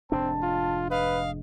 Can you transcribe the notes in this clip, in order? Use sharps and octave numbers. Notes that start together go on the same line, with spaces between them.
F1 G#2 C4 D4 A5
F4
B4 D#5 F5